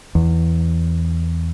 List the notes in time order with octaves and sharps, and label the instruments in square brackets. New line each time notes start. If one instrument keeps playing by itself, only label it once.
[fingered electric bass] E2